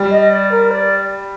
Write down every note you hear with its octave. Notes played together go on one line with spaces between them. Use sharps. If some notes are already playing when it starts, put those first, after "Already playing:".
Already playing: G3
D#5
D#5
D5
A#4
D5